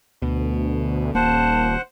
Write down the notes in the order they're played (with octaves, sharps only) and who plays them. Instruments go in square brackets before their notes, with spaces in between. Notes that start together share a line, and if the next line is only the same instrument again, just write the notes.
[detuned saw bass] D2 [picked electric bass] B2
[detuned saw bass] D#1 [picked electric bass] A#3 [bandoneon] C5 F#5 [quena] A5